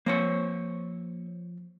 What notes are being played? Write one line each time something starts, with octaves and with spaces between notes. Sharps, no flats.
F3 A#3 C5 C#5